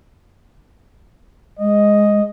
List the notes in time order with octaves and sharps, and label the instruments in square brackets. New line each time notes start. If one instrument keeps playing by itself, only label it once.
[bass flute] G#3 [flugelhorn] D#5